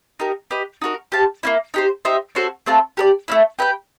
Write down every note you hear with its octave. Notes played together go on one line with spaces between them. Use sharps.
D#4 G4 A#4
G4 B4 D#5
D#4 F#4 A#4
G4 C5 F5 A5
A#3 C#4 E4
D#4 G4 C5
D#4 G4 C5 E5
C#4 F#4 A4 C5
A3 C4 F4 A4
G4 A#4 D5
A3 C#4 E4
G4 B4 E5 G5